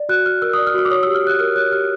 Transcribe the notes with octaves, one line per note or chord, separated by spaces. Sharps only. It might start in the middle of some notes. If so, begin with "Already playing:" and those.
Already playing: D5
F#4 F#6
F#4 F6
A#4 E6
D5 D#6
F6
F#4 E6
D6
C#5 D#6
G4 E6
F6
G4 F#6
A#4 F6
C#5 F#6
G4 F6